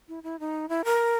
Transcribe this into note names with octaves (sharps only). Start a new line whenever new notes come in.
E4
E4
D#4
E4
A#4